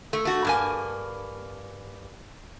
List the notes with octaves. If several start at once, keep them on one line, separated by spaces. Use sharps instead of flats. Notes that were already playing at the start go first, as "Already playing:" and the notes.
A3
A3 F#4
G2 A#3 G#5